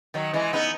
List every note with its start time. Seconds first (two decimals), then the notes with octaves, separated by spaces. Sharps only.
0.14 D#3 F#3
0.34 E3 G#3
0.53 B3 D#4